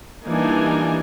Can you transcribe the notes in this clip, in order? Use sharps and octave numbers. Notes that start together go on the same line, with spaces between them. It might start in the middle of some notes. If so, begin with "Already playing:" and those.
E3 G3 A#3 D4 D#4 G#5